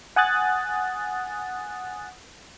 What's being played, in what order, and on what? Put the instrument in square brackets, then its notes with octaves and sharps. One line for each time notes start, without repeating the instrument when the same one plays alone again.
[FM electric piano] F#5 G#5 D#6 F#6 A6